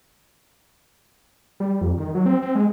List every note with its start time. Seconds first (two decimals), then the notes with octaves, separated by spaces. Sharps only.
1.60 G3
1.81 F2
1.98 D#3
2.15 F#3
2.26 C4
2.42 C4
2.55 G#3